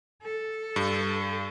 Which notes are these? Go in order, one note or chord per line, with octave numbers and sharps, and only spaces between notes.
A4
G2